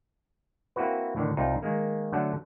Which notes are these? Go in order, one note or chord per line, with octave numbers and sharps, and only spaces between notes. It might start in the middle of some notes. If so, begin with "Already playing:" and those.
A#3 C4 E4 F#4 B4
A2 D3 D#3
C2 D#4 F4 G5
D#3 G#3 A#3
D3 F#3 A3 F#5 A5